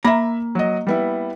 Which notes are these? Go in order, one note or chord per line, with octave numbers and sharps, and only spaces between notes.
A#3 E5 A#5 B5
F#3 D#5
G3 B3 E4